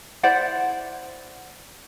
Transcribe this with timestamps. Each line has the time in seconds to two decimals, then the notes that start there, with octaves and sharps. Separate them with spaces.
0.23 E4 C5 D5 F#5